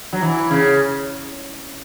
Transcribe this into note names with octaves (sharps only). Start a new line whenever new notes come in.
F#3
E3
C#3